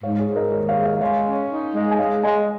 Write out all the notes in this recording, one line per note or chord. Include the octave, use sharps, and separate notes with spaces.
G#2 C#5 F5
G#4 C#5
G#2
A#4 D#5
D#2 G#4 C#5
C#5 F5
G#3
C#5 F5
G#3 C#5 F5
C#4
D#4
G#3
G#5
G#3 C#5 F5
G#3 D#5 G#5